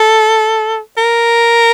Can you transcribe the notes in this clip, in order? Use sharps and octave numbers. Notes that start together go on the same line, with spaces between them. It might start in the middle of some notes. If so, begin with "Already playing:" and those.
Already playing: A4
A#4